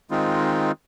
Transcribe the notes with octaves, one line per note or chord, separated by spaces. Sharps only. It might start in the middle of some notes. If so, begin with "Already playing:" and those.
D#3 G#3 C4 D#4 F4